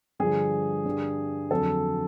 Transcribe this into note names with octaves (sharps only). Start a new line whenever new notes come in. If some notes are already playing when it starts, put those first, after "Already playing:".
G2 D3 F3 G#4
G2 D3 G3
F2 D3 F#3 A4